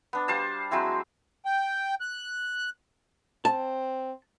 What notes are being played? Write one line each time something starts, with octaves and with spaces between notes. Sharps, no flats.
B3 D4
G3 C5 F5 A5
F#3 G#3 C4 E4
G5
F#6
C4 A5